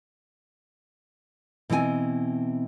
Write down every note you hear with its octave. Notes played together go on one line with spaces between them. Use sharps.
B2 E3 C4 D#5 G#5